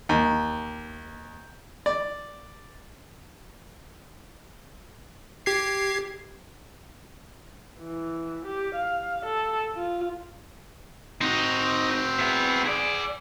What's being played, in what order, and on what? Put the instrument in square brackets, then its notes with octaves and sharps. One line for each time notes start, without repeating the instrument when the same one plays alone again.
[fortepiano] D#2
D5
[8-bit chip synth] G4 G#6 C7
[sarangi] E3
G4
F5
A4
F4
[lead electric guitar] C4 F#4 [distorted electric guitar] D#4
[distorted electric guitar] B3 E5
G#4 D5